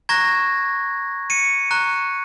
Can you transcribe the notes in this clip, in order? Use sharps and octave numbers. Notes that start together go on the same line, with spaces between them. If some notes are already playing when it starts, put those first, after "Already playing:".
A#5 C#6 F#6 G#6 A#6
C#7 D#7
A#5 C#6 F#6